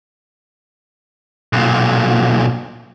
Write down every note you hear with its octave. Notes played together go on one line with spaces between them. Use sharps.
B1 A#2